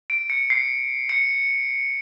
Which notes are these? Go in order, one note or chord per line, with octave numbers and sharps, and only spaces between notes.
D7
C#7
C7
C#7